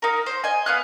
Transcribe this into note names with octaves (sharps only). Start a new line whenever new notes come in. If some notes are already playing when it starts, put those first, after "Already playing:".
D#4 A#4
C5
D#5 G#5
B3 F5 F#6